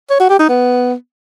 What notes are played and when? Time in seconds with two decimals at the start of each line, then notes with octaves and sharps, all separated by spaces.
0.10 C#5
0.20 F#4
0.30 G4
0.39 D#4
0.49 B3